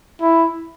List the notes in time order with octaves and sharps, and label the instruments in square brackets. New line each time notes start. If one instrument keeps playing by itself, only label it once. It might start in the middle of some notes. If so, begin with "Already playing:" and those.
[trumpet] E4